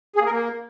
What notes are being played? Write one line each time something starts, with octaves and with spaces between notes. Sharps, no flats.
G#4
A#3
A#4
A#3